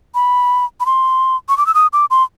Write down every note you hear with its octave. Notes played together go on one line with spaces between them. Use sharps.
B5
B5
C6
C#6
D6
E6
D#6
D6
C6